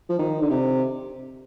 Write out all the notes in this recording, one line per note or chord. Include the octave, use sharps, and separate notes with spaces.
F3
D#3
D3
C3